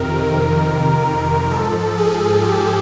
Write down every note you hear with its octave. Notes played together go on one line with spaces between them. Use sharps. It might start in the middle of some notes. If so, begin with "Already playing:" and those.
Already playing: F2 C3 D#3 A#4
G#2 F3 A4
G#4
G4